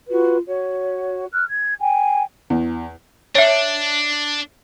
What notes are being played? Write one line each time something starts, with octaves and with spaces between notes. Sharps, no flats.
F4 F#4 B4
F#4 C#5
F6 F#6
G#6
G5 G#5
E2
D4 C#5 E5